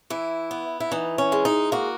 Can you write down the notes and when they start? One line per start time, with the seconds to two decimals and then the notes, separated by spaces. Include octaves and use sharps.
0.10 E3 E4
0.51 B3
0.80 E4
0.92 E3 D#4
1.18 C#4
1.32 G#3
1.45 D#4
1.72 A#3 F#4